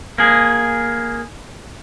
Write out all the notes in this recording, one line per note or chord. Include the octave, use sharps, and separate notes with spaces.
A#3 G#4